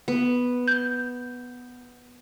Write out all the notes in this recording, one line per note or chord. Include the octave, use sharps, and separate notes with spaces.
B3
G6